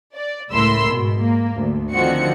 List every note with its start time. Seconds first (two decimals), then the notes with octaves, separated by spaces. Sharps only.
0.14 D5
0.51 C#2 A2 A#4 B5 C6 E6
0.90 G#2 B2
1.21 A#3
1.56 D2
1.92 D3 D#3 F3 C4 F#4 C#7